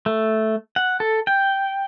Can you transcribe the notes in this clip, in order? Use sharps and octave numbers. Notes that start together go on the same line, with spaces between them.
A3
F#5
A4
G5